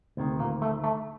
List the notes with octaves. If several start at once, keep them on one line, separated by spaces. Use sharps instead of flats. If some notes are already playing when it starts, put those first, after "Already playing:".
D2 C3 D#3
A#2 A#3
A3
A3